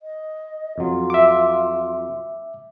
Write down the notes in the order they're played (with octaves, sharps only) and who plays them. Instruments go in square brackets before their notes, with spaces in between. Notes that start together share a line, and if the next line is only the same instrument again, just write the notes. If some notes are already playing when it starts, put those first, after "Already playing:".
[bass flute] D#5
[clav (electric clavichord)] F2 F#3 [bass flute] F4
[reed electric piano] E5 D6